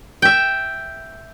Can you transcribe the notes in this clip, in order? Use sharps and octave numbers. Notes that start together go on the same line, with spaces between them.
E5 G5